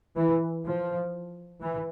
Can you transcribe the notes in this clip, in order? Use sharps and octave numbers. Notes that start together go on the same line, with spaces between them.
E3
F3
E3